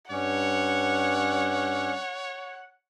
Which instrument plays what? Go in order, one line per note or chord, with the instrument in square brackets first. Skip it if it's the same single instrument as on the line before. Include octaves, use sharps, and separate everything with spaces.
[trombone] G2 [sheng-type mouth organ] C#4 D5 [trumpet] C#5 [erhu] F#5